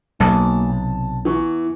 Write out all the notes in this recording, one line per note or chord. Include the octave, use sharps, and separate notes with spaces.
B1 A#3 F#4 G#5 A5
C3
E2 E3 C#6